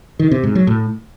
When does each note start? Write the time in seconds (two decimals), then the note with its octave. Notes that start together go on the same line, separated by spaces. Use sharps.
0.19 D#3
0.31 C3
0.43 G#2
0.55 F#3
0.67 A2